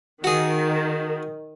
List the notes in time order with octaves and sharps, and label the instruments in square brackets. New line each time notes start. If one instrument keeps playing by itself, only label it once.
[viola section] D#3 [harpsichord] F#4 G#4